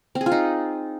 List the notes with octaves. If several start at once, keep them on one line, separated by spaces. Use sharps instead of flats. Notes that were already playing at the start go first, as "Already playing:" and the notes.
C4
G#4
F4
D#4